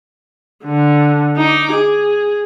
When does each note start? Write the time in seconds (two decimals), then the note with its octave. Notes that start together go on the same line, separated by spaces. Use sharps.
0.65 D3
1.37 D#4 D6
1.72 G#4